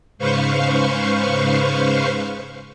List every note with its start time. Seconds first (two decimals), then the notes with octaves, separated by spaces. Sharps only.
0.18 G#2 C#3 B4 C5 F5 C#6